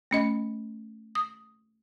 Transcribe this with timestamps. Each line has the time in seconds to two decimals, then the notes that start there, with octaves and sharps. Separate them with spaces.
0.11 A3 C#4 D#5
1.15 D#6